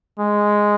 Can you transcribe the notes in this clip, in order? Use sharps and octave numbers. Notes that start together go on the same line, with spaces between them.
G#3